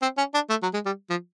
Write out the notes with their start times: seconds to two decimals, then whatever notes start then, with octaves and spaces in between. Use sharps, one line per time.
0.02 C4
0.18 C#4
0.34 D4
0.49 A3
0.63 F#3
0.74 G#3
0.86 G3
1.10 F3